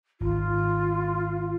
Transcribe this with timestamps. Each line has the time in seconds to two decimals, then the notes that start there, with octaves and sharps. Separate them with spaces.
0.20 G#1 F4